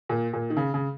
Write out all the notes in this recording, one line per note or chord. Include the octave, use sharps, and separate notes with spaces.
A#2
A#2
D#3
C#3
C#3